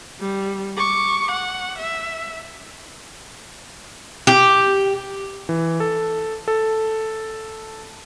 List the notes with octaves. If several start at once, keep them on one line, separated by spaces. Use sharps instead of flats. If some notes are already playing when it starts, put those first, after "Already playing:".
G3
C#6 D6
F#5
E5
G4
E3
A4
A4